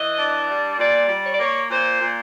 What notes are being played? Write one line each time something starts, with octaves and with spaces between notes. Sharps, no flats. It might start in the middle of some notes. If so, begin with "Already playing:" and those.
Already playing: E3 D#5
D4
G3
A#2 D5
G3
C#5
D5
A#3 C#5
A#2 C5
A#2